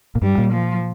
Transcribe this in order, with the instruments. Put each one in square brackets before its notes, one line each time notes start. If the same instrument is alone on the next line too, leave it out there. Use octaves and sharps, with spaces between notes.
[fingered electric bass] A#2
[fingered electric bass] G2 [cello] G3
[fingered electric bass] A#2
[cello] F3